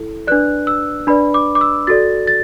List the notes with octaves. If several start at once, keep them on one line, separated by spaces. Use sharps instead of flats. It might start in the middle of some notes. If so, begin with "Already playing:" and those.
Already playing: E4 A4
D4 B4 D5 F#6
E6
D4 B4 D5 B5
D6
D6
E6
F#4 A4 D5 A6
A6